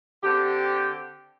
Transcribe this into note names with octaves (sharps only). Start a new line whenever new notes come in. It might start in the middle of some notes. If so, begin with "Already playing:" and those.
D3 C4 G4